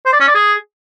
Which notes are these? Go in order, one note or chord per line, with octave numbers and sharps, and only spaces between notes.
C5
D5
C#4
D5
G#4